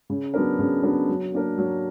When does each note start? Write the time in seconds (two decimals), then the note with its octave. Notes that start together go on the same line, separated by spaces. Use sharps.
0.10 C#3
0.34 F#3 B3 D4 A#4
0.59 C#3
0.83 F#3 B3 D4 A#4
1.08 F#3
1.33 A#3 D4 A#4
1.58 F#3